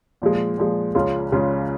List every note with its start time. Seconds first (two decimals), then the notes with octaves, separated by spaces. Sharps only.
0.22 A#2 F3 G#3
0.58 A#2 F3 G#3
0.95 C#2 C#3 G#3 C#4 F4
1.32 C#2 C#3 G#3 C#4 F4